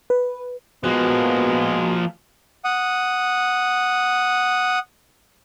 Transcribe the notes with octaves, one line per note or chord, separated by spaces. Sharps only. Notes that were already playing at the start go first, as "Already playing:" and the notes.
B4
F3 G#3 A#3 B3 F#4
F#5 D#6